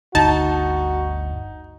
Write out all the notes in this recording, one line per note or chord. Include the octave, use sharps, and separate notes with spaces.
G1 D2 D#4 F#4 A5